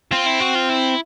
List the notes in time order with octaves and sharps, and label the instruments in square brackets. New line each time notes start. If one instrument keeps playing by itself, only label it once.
[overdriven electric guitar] C4 [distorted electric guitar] F4
[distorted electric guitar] E4
F#4
F4
E4